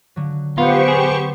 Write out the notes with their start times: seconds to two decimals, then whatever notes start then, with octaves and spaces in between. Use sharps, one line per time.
0.16 D3 F#3
0.58 B3 F4 G4 C5 C#6
0.88 G#4